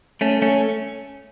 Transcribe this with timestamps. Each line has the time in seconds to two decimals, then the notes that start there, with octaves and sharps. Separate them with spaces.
0.21 A3 C#4
0.42 A3 C#4